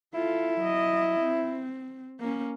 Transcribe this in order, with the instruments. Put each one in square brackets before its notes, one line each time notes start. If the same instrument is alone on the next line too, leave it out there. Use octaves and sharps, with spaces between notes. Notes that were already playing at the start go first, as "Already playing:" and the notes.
[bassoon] E4 [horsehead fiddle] F4 A4
[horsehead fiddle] F#3 D#5
C4
A#3 C#4